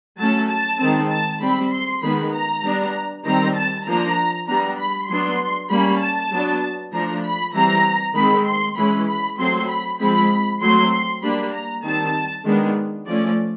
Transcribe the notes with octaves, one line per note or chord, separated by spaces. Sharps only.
F#3 A3 C#4 A5
A5
D#3 G#3 C4
A5
G3 C4 B5
C6
D#3 G#3 B3 B5
A#5
G3 B3 D4
D#3 G3 C4 A#5
A5
F3 A#3 D4 A#5
G3 B3 D4 A#5
B5
F#3 B3 D4 C6
G3 A#3 C#4 B5
A5
F#3 B3 D4
F3 A3 D4 A#5
B5
E3 G3 C4 A#5
D#3 G#3 C4 B5
C6
E3 G#3 C#4 B5
B5
F#3 A3 C4 C6
B5
F3 G#3 C4 B5
F#3 A3 C4 C6
G3 A#3 D4 B5
A#5
D#3 G3 C4 A5
D#3 G#3 B3 D4
F3 A3 C#4 D5